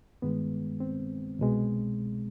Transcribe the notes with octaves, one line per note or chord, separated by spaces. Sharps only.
G2 D#3 G#3 B3
C4
C2 B2 G#3